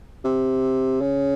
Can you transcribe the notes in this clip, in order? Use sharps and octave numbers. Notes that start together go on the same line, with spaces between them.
C3
C#3